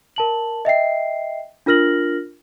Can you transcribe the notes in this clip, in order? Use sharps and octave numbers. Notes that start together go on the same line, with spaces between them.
A#4 A5 F#7
D#5 E5 G5 C7
D4 F4 A#4 F6 A#6 F#7